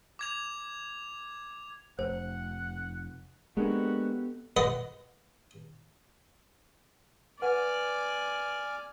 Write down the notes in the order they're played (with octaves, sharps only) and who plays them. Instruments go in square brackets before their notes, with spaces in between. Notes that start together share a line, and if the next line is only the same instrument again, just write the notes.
[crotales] D6 G#6 F7
[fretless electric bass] F1 [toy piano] C5 [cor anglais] F#5
[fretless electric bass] G#3 A#3 D4 [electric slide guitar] B3 G4 A4 [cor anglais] F#4
[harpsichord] B4 D5 D#5 F#5 C6
[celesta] B4 F#5 [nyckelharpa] D5 [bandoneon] G#5 F6